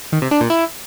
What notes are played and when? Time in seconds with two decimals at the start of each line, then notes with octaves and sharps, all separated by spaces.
0.12 D#3
0.22 C3
0.31 D4
0.41 A#2
0.50 E4